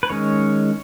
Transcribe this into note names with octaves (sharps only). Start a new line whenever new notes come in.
B4
D#3 G#3 C#4 C#5